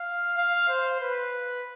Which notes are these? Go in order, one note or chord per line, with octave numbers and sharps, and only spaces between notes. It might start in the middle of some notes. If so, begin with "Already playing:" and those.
Already playing: F5
F5
C5
B4